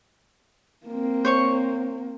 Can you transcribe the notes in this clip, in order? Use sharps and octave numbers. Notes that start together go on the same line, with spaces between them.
A#3 C4
C5 C#5 C#6